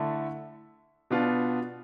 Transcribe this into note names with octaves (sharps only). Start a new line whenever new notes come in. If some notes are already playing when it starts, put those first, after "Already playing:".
Already playing: D3 A3 E4
B2 B3 D4 F4